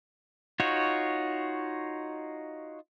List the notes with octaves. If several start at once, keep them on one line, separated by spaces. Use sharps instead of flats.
D#4 F4 F#4 C#5